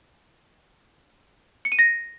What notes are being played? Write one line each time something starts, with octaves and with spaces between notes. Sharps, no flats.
C#7
D#7
A#6